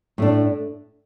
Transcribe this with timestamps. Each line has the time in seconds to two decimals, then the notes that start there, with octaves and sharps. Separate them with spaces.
0.18 A2 A3 D4